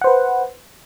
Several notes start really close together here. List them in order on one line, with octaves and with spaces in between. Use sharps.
F#5 C5 B4